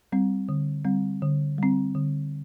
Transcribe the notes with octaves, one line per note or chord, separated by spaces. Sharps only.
G3 C4
D3
G3 C4
D3
G3 C4
D3